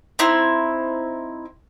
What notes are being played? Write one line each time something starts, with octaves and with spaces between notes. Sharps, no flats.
C4 D#4 E4